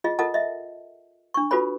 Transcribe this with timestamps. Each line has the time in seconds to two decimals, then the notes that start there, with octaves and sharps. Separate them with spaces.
0.04 F4 G#4 D#5
0.19 F4 A4 A#4 D#5 F#5 A5
0.34 D#5 E5
1.34 D4 C#6
1.51 F4 F#4 A4 B4 C#5 B5